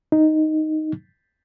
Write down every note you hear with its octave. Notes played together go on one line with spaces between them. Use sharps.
D#4